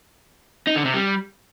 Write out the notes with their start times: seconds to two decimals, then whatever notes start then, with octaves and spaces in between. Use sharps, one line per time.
0.67 D#4
0.76 D3
0.85 C3
0.94 G3